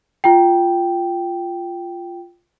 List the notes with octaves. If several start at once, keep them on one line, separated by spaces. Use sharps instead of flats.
F4 G5